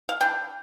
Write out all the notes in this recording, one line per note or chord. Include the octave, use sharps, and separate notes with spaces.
F5
E3 A#3 D4 G5